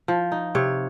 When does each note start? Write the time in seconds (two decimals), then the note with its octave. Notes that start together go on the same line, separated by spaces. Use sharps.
0.08 F3
0.32 D#4
0.55 C3 C#5